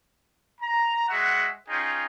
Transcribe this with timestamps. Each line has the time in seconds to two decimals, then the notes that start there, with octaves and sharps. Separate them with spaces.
0.60 A#5
1.08 G#3 F#4 E5 F#5
1.68 C#4 D#4 F4 G#4 G5